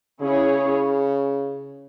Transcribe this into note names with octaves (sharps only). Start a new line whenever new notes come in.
C#3 C#4 E4 G#4 C#5